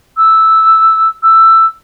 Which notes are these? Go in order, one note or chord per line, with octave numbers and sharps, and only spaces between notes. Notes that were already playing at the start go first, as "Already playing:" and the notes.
E6
E6